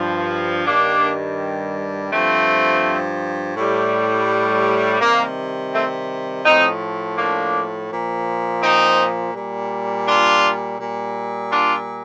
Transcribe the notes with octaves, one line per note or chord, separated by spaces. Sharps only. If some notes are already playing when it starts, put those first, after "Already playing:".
Already playing: G2 F3
G2 D#3 G3 A#3 D4
G2 F3 A3 C4
A2 G3
C3 D#3 G3 A#3
A3 C4
A2 F3 C4 D#4
A#3 D4
A#2 F3
C4 D#4
A#2 G3
D4 F4
A#2 G3
D4 F4